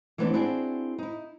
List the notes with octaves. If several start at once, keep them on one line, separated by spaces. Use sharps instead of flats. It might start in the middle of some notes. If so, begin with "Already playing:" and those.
E3 G3 A3 B3 C4 D4
C4 D4 E4 F#4 G#4
D#4 E4